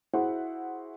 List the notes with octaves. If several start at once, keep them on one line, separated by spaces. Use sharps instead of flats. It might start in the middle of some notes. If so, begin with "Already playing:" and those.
E4 F#4 G#4 C5 E5 F#5